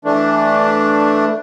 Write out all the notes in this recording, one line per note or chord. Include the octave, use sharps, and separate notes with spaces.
E3 A3 D4